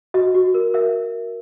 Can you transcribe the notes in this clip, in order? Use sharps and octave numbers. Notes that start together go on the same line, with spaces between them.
F#4 D#5
F#4
A#4
A#4 E5